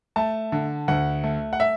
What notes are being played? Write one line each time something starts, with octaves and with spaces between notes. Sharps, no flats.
A3 A5
D3
D2 F#5
A3
F#5
E5